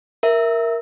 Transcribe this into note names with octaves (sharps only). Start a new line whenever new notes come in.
A#4 E5